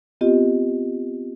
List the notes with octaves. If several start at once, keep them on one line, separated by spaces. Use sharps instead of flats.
B3 C4 F4 G4 D#5